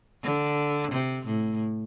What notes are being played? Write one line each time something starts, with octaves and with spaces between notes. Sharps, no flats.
D3
C3
A2